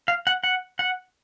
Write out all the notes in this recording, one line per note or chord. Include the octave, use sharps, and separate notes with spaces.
F5
F#5
F#5
F#5